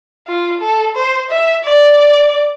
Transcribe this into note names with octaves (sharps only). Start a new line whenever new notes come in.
F4
A4
C5
E5
D5